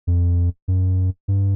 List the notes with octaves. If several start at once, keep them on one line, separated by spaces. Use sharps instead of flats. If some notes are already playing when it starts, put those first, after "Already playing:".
F2
F#2
G2